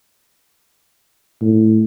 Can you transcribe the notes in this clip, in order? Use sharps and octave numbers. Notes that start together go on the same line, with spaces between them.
A2